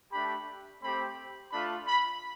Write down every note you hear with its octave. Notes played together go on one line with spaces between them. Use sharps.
A3 D4 G4 B5
A3 C4 G4 B5
A3 D4 F4 B5
B5